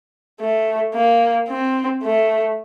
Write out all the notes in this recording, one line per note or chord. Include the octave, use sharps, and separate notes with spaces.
A3
A#3
C4
A3